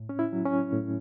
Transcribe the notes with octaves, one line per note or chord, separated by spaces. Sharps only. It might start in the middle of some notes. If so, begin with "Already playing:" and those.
Already playing: A2
C#4
E4
F#3
C#4
A2